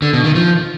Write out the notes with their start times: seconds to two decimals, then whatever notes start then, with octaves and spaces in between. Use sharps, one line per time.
0.02 D3
0.13 B2
0.24 D#3
0.35 F3